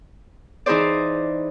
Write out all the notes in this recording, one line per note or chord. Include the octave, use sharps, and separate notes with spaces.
E3 D#4 E4 G#4 C5 D5